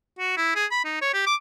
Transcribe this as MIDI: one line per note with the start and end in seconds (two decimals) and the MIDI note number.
0.19 0.36 66
0.37 0.55 64
0.55 0.66 68
0.71 0.81 83
0.85 0.97 63
1.01 1.11 73
1.13 1.24 67
1.27 1.35 86